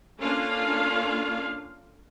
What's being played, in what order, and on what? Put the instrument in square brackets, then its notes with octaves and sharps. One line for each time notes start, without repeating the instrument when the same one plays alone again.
[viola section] A#3 C#4 D4 F4 A4 F5